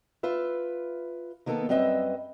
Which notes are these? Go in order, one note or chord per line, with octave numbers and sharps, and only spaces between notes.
F4 B4 E5
D#3 A#3 B3 G#4 A4
F#2 G3 C4 B4 D#5 E5